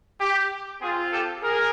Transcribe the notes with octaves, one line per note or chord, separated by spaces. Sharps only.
G4
C4 F4 G#4
G4 A4
G#4 A#4